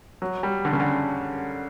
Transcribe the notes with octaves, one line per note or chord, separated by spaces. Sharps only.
F#3
G3
D3
C#3
D3